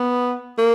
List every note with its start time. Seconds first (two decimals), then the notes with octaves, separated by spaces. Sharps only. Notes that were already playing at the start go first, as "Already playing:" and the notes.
Already playing: B3
0.59 A#3